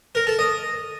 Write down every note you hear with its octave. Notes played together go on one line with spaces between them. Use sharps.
A#4
A4
D#5